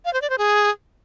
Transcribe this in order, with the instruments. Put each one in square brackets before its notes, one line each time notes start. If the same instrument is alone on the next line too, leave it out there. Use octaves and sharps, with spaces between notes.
[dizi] F5
C5
D5
C5
G#4